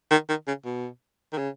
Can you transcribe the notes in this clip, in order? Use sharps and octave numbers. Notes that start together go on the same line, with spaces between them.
D#3
D#3
C#3
B2
D#3
C#3